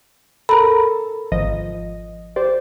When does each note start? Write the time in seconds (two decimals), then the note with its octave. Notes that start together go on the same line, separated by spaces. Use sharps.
0.49 A4 A#4 A#5 B5
1.32 G#1 F3 D#5
2.36 G4 C5 D5